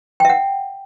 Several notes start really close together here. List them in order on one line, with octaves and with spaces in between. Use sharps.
G5 E5 F#5